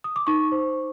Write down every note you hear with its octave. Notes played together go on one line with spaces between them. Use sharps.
D#6
D6
D#4 C#6
C5